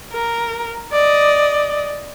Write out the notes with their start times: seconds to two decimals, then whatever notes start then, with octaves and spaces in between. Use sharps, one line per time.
0.12 A#4
0.92 D5 D#5